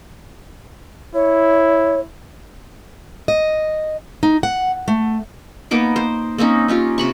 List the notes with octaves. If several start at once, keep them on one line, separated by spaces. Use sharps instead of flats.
E4 C#5
D#5
D#4
F#5
A3
A#3 B3 D#4 D6
C5
A#3 C4 C#4 D#4
C#4 D#4 F4 G4
C3 B5 C#6